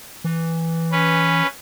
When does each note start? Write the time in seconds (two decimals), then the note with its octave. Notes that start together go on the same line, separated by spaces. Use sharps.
0.24 E3
0.92 C#4 B4